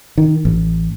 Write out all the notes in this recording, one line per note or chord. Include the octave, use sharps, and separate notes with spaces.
D#3
A1